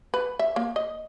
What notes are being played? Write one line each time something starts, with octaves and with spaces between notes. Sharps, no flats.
B4
E5
A#3
D#5